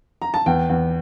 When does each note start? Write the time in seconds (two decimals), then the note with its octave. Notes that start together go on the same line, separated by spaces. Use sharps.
0.22 A#5
0.34 A5
0.46 E2 G5
0.69 E2